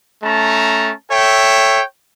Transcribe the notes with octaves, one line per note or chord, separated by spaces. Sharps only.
A3 C#4 A5 A#5
A4 C#5 E5 G5